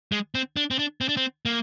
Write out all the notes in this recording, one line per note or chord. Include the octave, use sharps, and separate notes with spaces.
G#3
C4
D4
C4
D4
C4
D4
C4
A#3